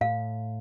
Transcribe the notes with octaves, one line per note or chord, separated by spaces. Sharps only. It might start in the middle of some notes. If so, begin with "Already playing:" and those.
A2 F5